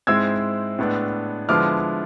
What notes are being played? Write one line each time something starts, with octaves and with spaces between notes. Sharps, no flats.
G#2 G#3 C4 E4 E6 G#6
A2 G#3 B3 D4
D3 F3 G#3 B3 E4 D6 F6